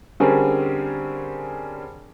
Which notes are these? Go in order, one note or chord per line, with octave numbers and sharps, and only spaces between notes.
D3 G3 C4 C#4 G#4 A#4